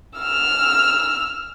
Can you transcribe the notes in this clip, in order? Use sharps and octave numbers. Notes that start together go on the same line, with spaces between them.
E6 F6